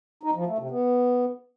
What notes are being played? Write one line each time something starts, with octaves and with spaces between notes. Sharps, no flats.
D#4
F3
A3
C3
B3